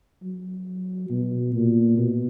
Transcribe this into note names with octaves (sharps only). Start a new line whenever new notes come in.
F#3
B2
A#2
B2